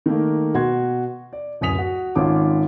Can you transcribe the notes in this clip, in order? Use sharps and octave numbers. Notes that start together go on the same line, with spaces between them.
D#3 A3 A#3
B2 F#4 C6 G#6
D5
D1 F#2 G#5 D#6 B6 F7
F#4
G#1 D#3 C#4 F4 A5 D6